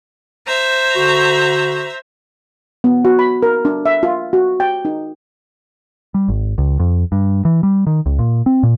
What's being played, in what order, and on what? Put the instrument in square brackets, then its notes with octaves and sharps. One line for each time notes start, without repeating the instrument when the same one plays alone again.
[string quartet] C5 E5 A#5
[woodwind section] D3 F#4
[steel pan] B3
F#4
B5
A#4
D4
E5
F4
F#4
G5
D#4
[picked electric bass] G3
G#1
C#2
F2
G2
E3
G3
D#3
C#2
A#2
C4
A#2